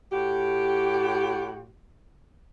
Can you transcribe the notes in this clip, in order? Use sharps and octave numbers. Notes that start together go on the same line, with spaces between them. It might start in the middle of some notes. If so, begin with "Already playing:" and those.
A2 F#4 G4